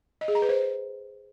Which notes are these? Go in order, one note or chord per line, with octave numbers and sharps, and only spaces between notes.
D#5
G#4
A#5
B4
C5